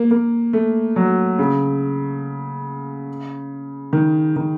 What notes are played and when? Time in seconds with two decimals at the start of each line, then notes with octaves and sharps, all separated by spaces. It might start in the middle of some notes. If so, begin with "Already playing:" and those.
Already playing: A#3
0.11 A#3
0.53 A3
0.96 F#3
1.39 C#3
3.93 D#3
4.36 D#3